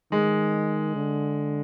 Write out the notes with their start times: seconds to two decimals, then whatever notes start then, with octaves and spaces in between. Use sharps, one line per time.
0.12 D#3 G#3
0.96 D3